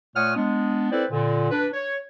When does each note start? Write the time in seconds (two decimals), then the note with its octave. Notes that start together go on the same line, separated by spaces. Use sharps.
0.15 A#2 A3 C#5 F#5 D#6 F6
0.35 G#3 B3 D4
0.91 C4 E4 A4 B4 C5 D5
1.11 A#2 D3
1.51 D4 B4
1.73 C#5